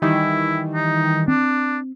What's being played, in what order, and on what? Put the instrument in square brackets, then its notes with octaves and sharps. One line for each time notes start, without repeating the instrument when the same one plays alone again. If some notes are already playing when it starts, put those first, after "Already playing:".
[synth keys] D#3 E3 G3 [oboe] E4
[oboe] D#4
[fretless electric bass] C4 [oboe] D4